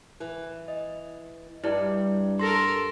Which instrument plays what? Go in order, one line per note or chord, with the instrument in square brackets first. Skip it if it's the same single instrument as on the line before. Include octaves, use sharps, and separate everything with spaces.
[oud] E3
[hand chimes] D#5
[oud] G2 [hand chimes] E4 D5
[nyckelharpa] A4 A#4 [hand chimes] C6 A#6